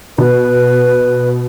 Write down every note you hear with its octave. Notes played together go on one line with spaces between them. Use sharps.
B2 B4